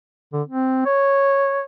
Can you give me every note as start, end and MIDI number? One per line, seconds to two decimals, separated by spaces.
0.33 0.42 50
0.48 0.84 60
0.86 1.62 73